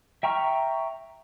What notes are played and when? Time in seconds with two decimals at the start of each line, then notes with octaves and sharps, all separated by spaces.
0.23 E5 G5 A#5 C#6 F6